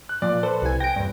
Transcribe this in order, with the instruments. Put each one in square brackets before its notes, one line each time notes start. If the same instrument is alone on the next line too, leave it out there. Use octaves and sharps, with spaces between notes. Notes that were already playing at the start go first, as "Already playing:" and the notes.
[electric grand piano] F#6
[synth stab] A#2 F3 [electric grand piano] D5
[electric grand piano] A4 B4 [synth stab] C5
[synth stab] C2 G#5
[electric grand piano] G5 [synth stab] A#6 D7
[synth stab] E2 G2